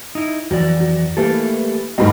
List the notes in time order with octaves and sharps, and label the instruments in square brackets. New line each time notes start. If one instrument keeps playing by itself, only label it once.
[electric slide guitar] D#4 E4
[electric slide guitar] F2 E3 D5 [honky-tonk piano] F#3
[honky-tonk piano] F#3
[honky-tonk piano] E3 G3 [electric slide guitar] A3 A#3 A4
[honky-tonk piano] D2 G2 D#3 [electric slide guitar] D#5